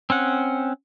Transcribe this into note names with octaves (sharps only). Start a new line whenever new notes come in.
C4 C#4 F#5